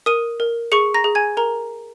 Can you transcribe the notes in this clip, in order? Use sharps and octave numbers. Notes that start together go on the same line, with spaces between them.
A#4 D#6 D#7
A#4
G#4 C#6 C#7
A#5 A#6
G#4
G#5 G#6
A#4 A#5